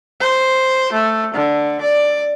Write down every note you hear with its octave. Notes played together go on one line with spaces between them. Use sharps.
C5
A3
D3
D5